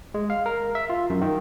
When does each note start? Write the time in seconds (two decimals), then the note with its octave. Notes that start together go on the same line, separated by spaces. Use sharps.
0.14 G#3
0.30 F5
0.46 A#4
0.75 E5
0.90 F4
1.10 F#2
1.21 D#3